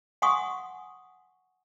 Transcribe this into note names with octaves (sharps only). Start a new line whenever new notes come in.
F5 F#5 G#5 C6 C#6 D#6